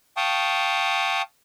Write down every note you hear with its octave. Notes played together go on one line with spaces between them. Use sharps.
F5 G5 A5 C#6 D#6